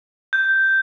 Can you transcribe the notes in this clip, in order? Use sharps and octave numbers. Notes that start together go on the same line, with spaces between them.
G6